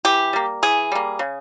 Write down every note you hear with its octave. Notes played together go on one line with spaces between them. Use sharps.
E3 G4
G3 A#3
E3 G#4
G3 A#3
C#3